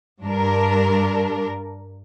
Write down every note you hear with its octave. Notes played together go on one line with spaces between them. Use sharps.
G2 D4 A#4